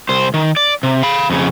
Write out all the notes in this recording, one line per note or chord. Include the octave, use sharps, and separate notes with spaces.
C2 C5
D#3
D5
C3
F5 B5
F2 C#3